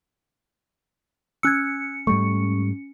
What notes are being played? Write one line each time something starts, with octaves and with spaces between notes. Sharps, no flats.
C#4 E6 F#6 G#6 C#7
G#2 G3 A3 C#6